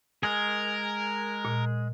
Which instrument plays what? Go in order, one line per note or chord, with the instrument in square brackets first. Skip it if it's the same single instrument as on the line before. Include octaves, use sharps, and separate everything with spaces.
[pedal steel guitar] G#3 G#4 [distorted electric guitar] A#4
[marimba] A#2